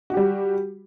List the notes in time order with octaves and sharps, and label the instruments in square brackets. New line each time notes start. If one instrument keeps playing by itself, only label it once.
[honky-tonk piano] F#4
G4
G3